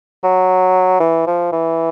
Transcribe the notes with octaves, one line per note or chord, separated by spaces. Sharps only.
F#3
E3
F3
E3